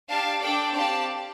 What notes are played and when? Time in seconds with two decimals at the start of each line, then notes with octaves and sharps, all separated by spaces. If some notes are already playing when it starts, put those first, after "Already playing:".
0.09 D4 G4 F5 A5
0.41 D4 A4 D5 G5
0.76 C4 G4 D5 F5 A5